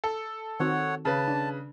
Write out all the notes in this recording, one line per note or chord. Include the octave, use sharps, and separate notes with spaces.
A4
D#3 C4 F#4 C#5 F#5
C#3 B4 A5
D4